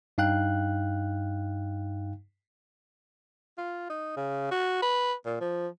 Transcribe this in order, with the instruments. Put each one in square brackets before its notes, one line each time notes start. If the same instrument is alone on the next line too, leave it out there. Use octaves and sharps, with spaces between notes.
[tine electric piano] G2 D#4 F5 G5 F#6
[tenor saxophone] F4
D#4
C#3
F#4
B4
A#2
F3